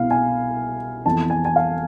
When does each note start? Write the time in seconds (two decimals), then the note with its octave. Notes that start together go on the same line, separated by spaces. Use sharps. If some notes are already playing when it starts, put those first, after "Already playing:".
Already playing: C2 B2 B3 E4 F5
0.11 G#5
1.05 F2 E3 B3 A5
1.30 G#5
1.45 G#5
1.56 F5